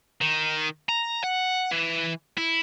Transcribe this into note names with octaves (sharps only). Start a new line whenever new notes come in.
D#3
A#5
F#5
E3
E4